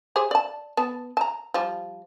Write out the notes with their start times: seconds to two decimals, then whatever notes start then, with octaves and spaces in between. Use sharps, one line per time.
0.16 G4 G#4 C5
0.31 D5 A5
0.77 B3 A5
1.17 A5 A#5
1.54 F3 G3